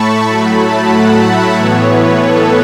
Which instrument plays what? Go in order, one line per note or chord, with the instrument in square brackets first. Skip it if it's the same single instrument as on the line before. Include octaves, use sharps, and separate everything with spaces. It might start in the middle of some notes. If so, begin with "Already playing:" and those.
Already playing: [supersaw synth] A2 A3 A5 B5 C#6
A2 F#3 A3 B5
A5
F#5
E5
A2 E3 B3 C#5
B4
A4